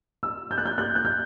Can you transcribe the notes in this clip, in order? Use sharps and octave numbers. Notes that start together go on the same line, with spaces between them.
E6
G6
F#6
G6
F#6
F#6
G6